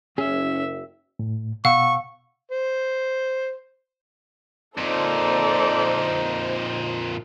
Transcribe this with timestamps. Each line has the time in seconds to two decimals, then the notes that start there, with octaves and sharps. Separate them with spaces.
0.18 F#1 C#4 G#4 E5
1.19 A2
1.65 B2 F5 F#5 C#6 E6
2.51 C5
4.78 F2 A#2 D#4 A4 C5 D5